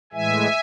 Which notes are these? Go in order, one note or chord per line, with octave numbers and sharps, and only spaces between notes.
A2 E3 G#3 E5 G#5